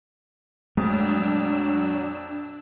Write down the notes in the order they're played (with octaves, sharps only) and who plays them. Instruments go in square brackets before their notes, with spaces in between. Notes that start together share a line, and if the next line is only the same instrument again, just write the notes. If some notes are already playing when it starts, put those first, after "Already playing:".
[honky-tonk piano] A#1 F2 [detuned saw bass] F#3 [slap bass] G#3 A3 [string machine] D4 E6